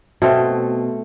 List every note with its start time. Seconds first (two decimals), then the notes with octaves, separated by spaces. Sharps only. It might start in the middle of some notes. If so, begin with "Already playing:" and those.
0.22 B2 A3 C4